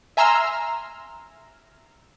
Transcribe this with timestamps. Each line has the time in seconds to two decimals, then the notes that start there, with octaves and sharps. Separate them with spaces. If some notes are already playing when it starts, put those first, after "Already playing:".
0.17 E5 G#5 A#5 C6 E6 F6